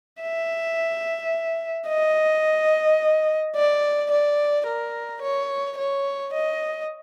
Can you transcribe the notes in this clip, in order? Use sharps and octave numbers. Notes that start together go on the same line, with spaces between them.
E5
D#5
D5
D5
A#4
C#5
C#5
D#5